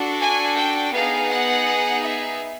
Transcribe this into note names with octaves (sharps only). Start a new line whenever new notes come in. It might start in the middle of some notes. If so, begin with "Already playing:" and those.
Already playing: D4 F#4 A4
G#5
G5
B3 D#4 G#4 F5
F#5
E5